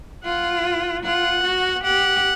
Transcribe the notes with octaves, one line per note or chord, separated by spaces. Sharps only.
F4 F#5
F4 F#5
F#4
G4 F#5